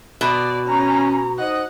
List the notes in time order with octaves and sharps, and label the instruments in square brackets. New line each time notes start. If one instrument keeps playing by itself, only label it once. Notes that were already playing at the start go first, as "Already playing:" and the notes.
[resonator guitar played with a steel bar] B2 [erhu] D5
[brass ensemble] C#4 [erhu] A#5
[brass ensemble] D#4 C5 D#5 [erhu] F#5